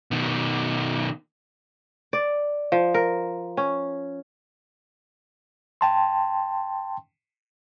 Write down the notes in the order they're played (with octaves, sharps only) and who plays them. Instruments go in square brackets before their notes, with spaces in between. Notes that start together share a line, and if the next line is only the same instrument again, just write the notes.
[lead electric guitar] B2 D#3
[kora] D5
F3
A#4
C#4
[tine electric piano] G5 A5 C6